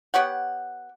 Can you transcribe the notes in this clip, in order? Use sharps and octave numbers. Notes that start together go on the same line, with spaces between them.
B3 G4 C#5 F#5